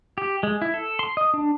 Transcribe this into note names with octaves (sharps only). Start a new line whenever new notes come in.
G4
G#3
E4
A4
C6
D#5
D4